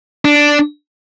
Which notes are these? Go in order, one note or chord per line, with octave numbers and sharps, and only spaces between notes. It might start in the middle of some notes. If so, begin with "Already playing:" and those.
D4